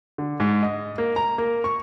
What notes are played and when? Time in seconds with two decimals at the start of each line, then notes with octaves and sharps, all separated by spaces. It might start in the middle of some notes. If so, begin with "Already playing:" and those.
0.18 D3
0.40 G#2
0.63 D#5
0.98 A#3
1.16 A#5
1.38 A#3
1.64 C#6